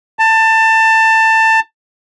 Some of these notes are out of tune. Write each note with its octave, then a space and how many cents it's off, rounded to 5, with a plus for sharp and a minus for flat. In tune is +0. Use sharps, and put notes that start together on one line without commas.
A5 +20